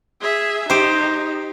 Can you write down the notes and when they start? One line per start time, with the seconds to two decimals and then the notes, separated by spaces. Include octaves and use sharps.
0.21 G#4 E5
0.70 D#4 G4 C5